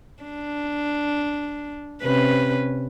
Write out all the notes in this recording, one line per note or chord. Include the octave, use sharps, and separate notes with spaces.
D4
C3 C#4 B4